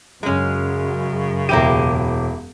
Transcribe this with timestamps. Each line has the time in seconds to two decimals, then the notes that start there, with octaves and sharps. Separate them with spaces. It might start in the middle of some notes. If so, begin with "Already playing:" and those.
0.23 F#2 C#3 G#3 C#4
1.49 E1 A#3 E4 G4 D#7